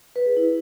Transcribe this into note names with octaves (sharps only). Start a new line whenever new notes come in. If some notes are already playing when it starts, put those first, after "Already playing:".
B4
G#4
E4